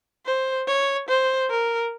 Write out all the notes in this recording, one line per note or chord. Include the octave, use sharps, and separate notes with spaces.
C5
C#5
C5
A#4